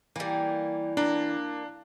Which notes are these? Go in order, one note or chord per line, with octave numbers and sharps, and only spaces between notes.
E3 G3 A#3
A#3 D4